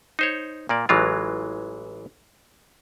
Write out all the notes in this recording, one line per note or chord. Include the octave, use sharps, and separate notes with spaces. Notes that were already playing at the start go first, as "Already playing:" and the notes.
D#4 C5 C#5
A#2 A#3 D5
A1 E3 F#3 G#3 F4